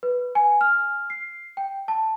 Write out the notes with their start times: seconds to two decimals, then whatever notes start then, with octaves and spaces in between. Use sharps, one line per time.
0.03 B4
0.35 G#5
0.61 F6
1.10 C7
1.57 G5
1.88 A5